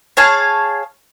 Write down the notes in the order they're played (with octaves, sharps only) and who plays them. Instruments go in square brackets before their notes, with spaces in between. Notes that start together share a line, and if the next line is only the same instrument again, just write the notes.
[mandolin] G#4 C#5 F5 A5